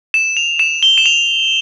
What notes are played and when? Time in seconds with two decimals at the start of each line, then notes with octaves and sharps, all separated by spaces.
0.14 E7
0.37 F7
0.59 E7
0.83 G7
0.98 E7
1.06 F7